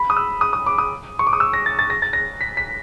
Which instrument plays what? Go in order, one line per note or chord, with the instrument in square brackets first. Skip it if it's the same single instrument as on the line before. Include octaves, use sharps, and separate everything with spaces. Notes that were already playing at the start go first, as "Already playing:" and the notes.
Already playing: [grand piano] B5
D#6
E6
D#6
D#6
D6
D#6
C#6
D6
D#6
E6
A#6
A6
A6
A#6
A6
A#6
B6
B6